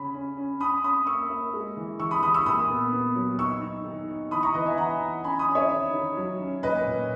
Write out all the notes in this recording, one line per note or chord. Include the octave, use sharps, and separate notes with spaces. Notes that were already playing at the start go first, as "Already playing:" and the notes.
Already playing: C#3 C#4 B5
C#4
C#4
C#4 B5 D#6
C#4 B5 D#6
A#3 C#6 E6
A#3
G#3
E3
E3 C#6 E6
B5 D#6
E3 B5 D#6
C#6 E6
A#2 B5 D#6
B3
B3
F#3
D#4 C#6 E6
D#4
D#3
D#4
E3 B5 D#6
A#5 C#6
E3 B4 D#5
E5 G#5
E3 F#5 A#5
D#4
C#4 G#5 B5
B5 D#6
C#4
C#5 E5
D#3
D#3
F#3
C#4
A#2 B4 D#5
A#2